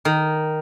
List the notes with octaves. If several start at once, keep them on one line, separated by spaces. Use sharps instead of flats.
D#3